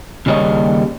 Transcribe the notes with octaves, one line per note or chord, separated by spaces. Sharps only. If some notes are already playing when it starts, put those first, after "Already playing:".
D#2 C#3 G3 A#3 C#5 D#5